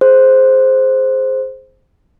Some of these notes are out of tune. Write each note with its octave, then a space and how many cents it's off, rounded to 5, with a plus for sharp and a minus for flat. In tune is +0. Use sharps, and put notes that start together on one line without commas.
G#4 +15 C5 +0